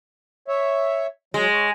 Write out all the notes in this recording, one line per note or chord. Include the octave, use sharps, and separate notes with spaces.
C#5 E5
F#3 G#3
C#5